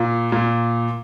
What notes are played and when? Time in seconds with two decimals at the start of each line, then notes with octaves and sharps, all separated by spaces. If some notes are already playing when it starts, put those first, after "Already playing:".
Already playing: A#2
0.32 A#2